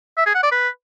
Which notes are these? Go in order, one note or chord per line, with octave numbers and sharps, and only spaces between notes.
E5
G#4
F#5
D5
B4